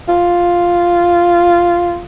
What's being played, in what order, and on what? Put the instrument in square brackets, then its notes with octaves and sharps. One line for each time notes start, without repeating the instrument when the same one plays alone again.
[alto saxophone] F4